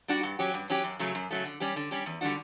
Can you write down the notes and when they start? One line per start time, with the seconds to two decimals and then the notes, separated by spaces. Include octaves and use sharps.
0.08 G3 D4 F#4
0.23 G2
0.39 F#3 C#4 G4
0.54 G2
0.70 F#3 C#4 G4
0.84 F#2
0.99 C#3 F#3 A3
1.15 F#2
1.31 C#3 F#3 A3
1.45 D3
1.60 G3 C#4 G4
1.76 D3
1.91 G3 C#4 G4
2.06 E2
2.21 D3 G3 D4 F#4